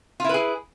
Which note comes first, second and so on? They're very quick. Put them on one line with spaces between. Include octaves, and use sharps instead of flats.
F4 E4 B4 G#4